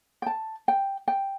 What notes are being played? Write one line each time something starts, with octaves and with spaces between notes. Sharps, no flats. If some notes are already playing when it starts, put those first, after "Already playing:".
G5
A5
G5
G5